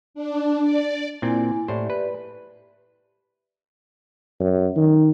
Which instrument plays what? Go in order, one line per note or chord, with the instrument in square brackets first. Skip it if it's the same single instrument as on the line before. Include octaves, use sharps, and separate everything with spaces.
[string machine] D4
D5
[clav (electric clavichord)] A#2 C4 D5 [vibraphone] E4 G#5
[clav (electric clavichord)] A2 C5 [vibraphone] G4 D5 E5
[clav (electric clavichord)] B4
[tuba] F#2
D#3